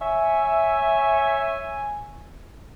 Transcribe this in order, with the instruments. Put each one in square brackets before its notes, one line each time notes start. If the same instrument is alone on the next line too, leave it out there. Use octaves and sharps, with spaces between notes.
[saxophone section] C#5 E5 [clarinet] G#5